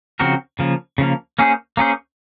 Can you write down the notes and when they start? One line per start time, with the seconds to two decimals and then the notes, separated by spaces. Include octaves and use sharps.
0.20 C#3 F3 C4 F#4 A#4
0.59 C#3 F3 A#3
0.98 C#3 F3 A#3
1.39 A#3 C#4 G#4 C5
1.77 A#3 C#4 G#4 C5